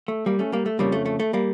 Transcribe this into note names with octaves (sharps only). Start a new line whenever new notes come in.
A3
G3 A#3
A3 C#4
G3 A#3
A3
F2 C#3 F3 G3 A#3
A3
A3
A3
G3 A#3